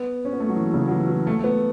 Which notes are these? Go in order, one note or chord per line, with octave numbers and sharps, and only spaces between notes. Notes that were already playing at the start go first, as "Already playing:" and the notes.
Already playing: B3
C#4
B3
A3
F#3
E3
C#3
F#3
E3
E3
A3
A3
B3